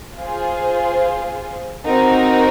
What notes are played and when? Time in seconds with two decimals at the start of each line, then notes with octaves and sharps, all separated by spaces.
0.20 F4 G#4 C5
1.86 C4 D#4 F#4 A#4